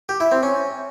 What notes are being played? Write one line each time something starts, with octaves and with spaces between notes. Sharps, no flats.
G4
E4
C4
C#4